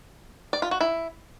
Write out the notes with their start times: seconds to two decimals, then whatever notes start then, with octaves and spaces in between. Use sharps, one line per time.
0.53 D5
0.62 F4
0.71 F#4
0.81 E4